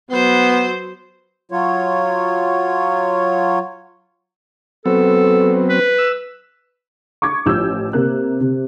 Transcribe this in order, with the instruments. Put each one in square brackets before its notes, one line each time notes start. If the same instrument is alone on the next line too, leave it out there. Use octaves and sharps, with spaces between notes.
[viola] F#3 C5 [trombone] B3
[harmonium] F#3 F4 C#5
[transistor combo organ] F#3 B3 C4 [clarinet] A4
[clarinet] B4
[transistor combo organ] E6
[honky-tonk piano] C#6 D6 G#6
A1 F3 E6 G6
C3 A#3 F#6
C3